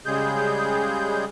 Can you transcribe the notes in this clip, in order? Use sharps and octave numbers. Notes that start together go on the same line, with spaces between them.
C#3 G3 G#3 G#4 G6